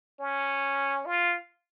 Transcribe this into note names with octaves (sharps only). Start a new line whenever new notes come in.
C#4
F4